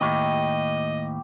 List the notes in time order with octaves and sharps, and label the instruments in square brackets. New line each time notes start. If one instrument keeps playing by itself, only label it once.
[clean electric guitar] D#2 A2 [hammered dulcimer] G4 [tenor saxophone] D#5